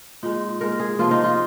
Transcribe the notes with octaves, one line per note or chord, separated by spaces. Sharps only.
A#2 G#3 D#4
A#2 G#3 A#4
G#4
C3 F3 A#3 F4
D#4
F4